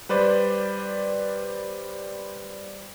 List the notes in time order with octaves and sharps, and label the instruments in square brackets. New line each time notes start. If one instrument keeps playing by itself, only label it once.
[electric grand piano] G3 B4 C5 D5